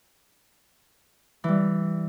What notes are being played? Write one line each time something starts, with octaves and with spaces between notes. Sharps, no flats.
E3 G3